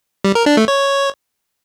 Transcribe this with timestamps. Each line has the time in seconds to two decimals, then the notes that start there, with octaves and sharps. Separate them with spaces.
0.24 G3
0.35 A#4
0.46 D4
0.57 A3
0.68 C#5